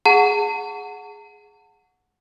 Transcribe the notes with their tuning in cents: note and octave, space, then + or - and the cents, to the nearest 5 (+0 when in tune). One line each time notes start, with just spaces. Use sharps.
G#4 +0 F#5 -10 A5 +40